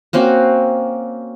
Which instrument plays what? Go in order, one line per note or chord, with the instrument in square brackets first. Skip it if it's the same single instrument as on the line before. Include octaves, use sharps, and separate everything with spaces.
[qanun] A#3 C4 C#4 F#4